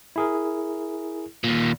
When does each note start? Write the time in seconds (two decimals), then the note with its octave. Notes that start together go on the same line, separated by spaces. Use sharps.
0.16 E4 G#4 A#4
1.44 D#2 A#2